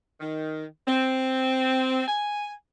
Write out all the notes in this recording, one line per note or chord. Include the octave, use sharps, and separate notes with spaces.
D#3
C4
G#5